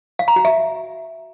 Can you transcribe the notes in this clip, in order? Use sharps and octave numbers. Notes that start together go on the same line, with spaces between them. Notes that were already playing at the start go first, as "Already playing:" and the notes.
F5
A#5
F#4
E5